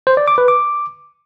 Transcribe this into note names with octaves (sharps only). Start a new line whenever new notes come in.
C5
D5
D6
B4
D6